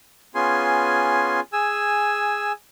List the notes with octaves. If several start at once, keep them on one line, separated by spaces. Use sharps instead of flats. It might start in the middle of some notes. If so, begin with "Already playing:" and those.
B3 C#4 F4 G#4 G#5 C6
G#4 G#5 E6